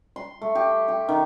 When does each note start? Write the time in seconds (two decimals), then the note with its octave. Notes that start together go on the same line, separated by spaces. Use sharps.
0.16 C6
0.42 A3
0.55 G4
0.88 G4
1.09 D#3